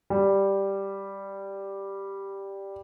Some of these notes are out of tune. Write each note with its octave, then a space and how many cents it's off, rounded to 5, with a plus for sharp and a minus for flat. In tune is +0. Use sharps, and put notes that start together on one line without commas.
G3 +0